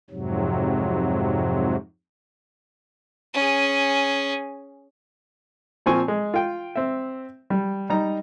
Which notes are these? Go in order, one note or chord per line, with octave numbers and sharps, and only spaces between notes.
F2 G#2 C3 F#3
C#4 G#4
A#2 F3 C4 G#5 C#6
G#3
F4 G5
C4 E5
G3
G3 D#4 A#5